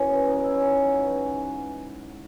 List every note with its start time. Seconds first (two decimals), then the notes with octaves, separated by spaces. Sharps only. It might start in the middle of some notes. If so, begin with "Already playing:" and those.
Already playing: F#2 C#3 E3 C#4
0.10 B3
0.28 B3 D#4
0.39 C#4 E4
0.50 C#4 E4
0.62 D#4 F#4
0.97 G#2 E3